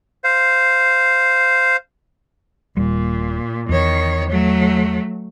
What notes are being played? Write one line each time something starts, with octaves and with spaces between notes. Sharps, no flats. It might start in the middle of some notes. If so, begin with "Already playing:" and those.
C5 F5
D#1 A#2 G3
E2 D#3 C#5
F#3 A3